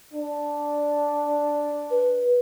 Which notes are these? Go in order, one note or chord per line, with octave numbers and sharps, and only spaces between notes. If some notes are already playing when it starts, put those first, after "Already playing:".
D4
B4